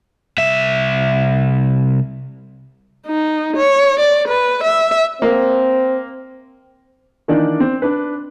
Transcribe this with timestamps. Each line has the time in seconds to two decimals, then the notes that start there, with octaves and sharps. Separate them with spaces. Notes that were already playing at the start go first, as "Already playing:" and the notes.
0.38 C2 E5
3.07 D#4
3.57 C#5
4.00 D5
4.28 B4
4.64 E5
5.22 A#3 C4
7.28 D#3 E3 A#3 D4 D#4 D5
7.60 C4
7.82 D4 B4